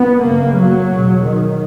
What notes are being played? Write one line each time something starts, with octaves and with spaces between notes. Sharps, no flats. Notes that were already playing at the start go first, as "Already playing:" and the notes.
Already playing: B3
F#2 C#3 A#3
F#3
E2 B2
D#3